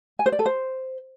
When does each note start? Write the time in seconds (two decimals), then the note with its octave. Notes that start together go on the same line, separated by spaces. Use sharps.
0.19 G#5
0.26 C5
0.32 D5
0.39 A4
0.46 C5